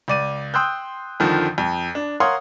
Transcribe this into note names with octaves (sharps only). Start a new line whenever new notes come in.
C#2 D5 D#7
G5 C6 D#6 E6 F#6 G6
F2 D3 D#3 F3
F2
D4
A#4 C#5 F5 F#5 C6 D#6